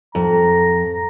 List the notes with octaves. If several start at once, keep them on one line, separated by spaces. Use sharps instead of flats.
F2 A#5